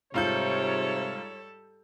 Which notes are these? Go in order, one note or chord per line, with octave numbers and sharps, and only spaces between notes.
G#2 C3 G3 F4 A4 C#5 G6